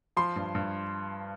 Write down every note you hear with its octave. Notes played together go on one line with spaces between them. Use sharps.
F3 C6
G2
G2